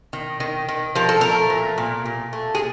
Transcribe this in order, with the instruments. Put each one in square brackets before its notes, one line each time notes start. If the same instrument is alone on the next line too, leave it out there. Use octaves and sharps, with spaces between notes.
[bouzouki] D#3
D#3
D#3
F3 A#4
A4
A3 A#4
A#2
A#2
A#2
A3
G#4